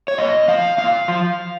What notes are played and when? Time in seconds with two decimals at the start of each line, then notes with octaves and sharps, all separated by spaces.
0.08 C#5
0.18 A#2 D#5
0.48 F3 F5
0.78 A#2 F5
1.08 F3